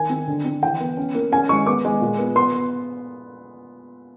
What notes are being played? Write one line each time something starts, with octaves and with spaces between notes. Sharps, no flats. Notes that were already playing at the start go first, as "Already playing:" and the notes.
Already playing: D#3 G#5
C4
D3
C4
E3 G5
B3
C#4
A#3
C#4 G#5
G#3 C#6
B3 D6
G#3
A#2
B3
B3 C6